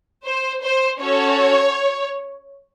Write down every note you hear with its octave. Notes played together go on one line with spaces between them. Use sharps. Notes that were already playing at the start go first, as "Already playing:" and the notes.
C5
C5
C#4 F#4 A4 C#5